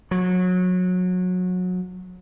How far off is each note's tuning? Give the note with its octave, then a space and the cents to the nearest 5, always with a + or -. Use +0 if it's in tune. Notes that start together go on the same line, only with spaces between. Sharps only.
F#3 -25